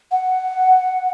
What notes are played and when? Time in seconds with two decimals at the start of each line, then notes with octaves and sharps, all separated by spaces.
0.12 F#5